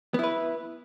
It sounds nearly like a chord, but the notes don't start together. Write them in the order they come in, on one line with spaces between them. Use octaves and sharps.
B3 E4 B4